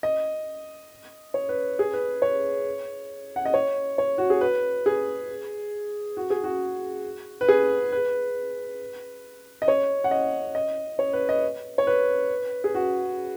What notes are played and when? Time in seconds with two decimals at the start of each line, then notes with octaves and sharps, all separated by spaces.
0.03 D#5
1.34 C#5
1.49 B4
1.79 G#4
1.93 B4
2.22 C#5
3.36 F#5
3.45 D#5
3.54 C#5
3.98 C#5
4.18 F#4
4.30 G#4
4.41 B4
4.86 G#4
6.17 F#4
6.30 G#4
6.44 F#4
7.41 B4
7.49 G#4
7.92 B4
9.62 D#5
9.68 C#5
10.04 F#5
10.11 D#5
10.55 D#5
10.99 C#5
11.13 B4
11.29 D#5
11.78 C#5
11.87 B4
12.64 G#4
12.75 F#4